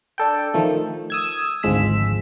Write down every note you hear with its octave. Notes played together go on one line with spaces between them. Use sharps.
D4 A4 G5
D#3 F3 A3
D#6 E6 G#6
G#1 D2 F3 G#3 E6 B6